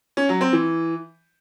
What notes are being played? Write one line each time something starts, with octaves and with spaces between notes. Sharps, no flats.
C#4
F#3
C4
E3